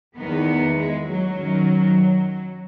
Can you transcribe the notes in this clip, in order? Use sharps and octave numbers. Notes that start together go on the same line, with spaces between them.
E2 D#3 B3
G#3
F#3
F#2 D#3